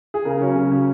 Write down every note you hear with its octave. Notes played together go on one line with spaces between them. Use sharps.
G#4
C#3 A#4
F#3 C#4
C#3
F#3 C#4